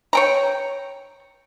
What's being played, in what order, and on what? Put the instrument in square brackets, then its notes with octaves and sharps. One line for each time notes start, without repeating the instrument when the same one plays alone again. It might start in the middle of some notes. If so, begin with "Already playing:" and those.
[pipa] C#5 G5 A#5